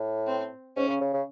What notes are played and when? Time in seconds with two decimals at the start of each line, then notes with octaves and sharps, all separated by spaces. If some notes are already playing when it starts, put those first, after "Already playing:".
Already playing: A2
0.27 C4
0.76 G#2 C#4
0.88 C#3
1.01 C#3
1.13 C#3